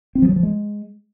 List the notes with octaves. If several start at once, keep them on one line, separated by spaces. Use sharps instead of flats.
C4
F3
F#3
F3
G#3